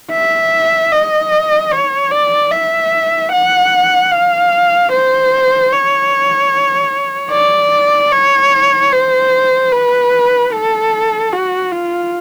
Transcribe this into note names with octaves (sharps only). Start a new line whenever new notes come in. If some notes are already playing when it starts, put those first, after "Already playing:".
E5
D#5
C#5
D5
E5
F#5
F5
C5
C#5
D5
C#5
C5
B4
A4
F#4
F4